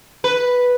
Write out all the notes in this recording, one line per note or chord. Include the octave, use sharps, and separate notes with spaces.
B4